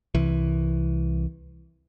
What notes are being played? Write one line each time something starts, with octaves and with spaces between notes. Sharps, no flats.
C2 E3